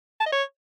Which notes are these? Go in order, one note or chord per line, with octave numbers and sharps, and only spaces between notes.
A5
D#5
C#5